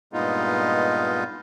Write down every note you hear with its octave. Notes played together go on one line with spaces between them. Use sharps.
G2 A#2 G#3 B3 D#4 F4